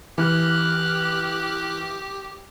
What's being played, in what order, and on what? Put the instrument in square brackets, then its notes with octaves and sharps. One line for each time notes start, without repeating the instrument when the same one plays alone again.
[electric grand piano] E3 [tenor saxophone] G4 [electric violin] F6 F#6